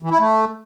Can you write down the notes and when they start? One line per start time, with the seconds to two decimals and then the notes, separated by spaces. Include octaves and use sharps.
0.03 E3
0.11 E4
0.19 A3